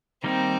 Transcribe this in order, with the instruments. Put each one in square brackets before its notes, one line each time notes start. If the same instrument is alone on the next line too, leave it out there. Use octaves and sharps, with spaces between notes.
[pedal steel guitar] D#3 G3 A#3 D#4 [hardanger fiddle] C4